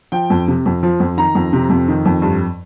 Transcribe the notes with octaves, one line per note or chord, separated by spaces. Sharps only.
F3 G5
F2
C3
F2
F3
F2
D#3 A#5
F2
C3
F2
D#3
F2
G2